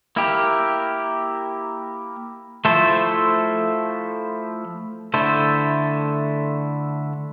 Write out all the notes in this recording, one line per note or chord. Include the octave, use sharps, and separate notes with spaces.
A#3 E4 G4 A#4
F3 A3 E4 A4 C5
D3 A3 E4 A4 C5